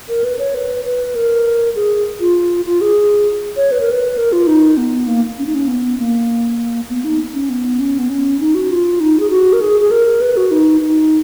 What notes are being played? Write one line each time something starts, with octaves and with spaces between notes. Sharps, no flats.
A#4
B4
C#5
B4
B4
A#4
G#4
F4
F4
G#4
C#5
B4
A#4
B4
A#4
F4
D#4
B3
A#3
C#4
D#4
C#4
B3
A#3
B3
D#4
C#4
B3
C#4
B3
C#4
D#4
F#4
F4
D#4
G#4
F#4
A#4
G#4
G#4
A#4
B4
F#4
D#4
D#4